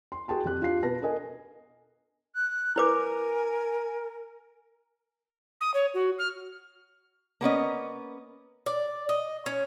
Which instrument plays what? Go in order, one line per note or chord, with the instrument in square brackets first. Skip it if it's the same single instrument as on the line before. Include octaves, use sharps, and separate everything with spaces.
[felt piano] C6
F#4 G#4 G5 A5 C6
F2 G4 F#6
D4 F4 G4 F5 C7
B2 B4 A5 A#6
D4 A4 A#4 D#5 G#5
[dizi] F#6
[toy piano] E4 B4 D6 [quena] A#4 [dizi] G#5
[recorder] D#6
C#5
F#4
F6
[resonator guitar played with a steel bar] A#3 B3 C#4 D#5
[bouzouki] D5
D#5
C#4